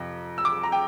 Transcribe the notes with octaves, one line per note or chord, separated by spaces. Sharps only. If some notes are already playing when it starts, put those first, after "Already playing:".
Already playing: F2 C3
E6
D6
A#5
G5